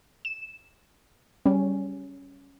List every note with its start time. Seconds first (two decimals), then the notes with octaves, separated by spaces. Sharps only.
0.25 E7
1.46 G3 C#4